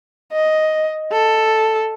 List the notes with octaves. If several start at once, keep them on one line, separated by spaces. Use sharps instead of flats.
D#5
A4